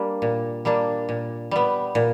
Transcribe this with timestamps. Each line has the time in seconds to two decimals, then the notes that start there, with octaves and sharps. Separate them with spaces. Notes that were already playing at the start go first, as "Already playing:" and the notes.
Already playing: G3 A#3 D4
0.22 A#2
0.65 G3 A#3 D4
1.09 A#2
1.51 G3 B3
1.95 A#2